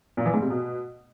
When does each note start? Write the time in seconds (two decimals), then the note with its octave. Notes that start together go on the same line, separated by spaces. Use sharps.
0.17 A#2
0.26 E3
0.34 G#2
0.42 C3
0.50 B2